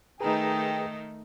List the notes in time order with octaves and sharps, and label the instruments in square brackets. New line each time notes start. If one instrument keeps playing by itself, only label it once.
[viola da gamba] D#3 A3 D#4 [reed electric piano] G#4 B4 A#5 [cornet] G5